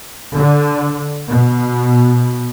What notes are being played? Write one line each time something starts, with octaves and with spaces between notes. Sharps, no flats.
D3
B2